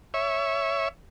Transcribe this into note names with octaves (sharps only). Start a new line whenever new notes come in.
C#5 E5